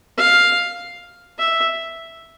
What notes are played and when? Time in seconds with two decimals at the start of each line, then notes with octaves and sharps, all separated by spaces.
0.18 F5
1.39 E5